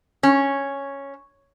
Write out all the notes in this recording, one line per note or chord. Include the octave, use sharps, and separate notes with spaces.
C#4